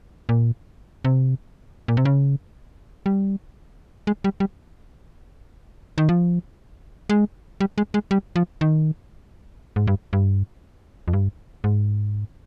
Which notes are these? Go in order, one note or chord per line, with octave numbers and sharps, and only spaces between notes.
A#2
C3
A#2
C3
C#3
G3
G#3
G3
G3
D#3
F3
G#3
G3
G#3
G#3
G3
F3
D#3
G#2
G2
G2
F2
G2
G#2